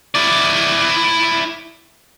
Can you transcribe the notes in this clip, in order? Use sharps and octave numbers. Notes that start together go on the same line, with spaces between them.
E4 D5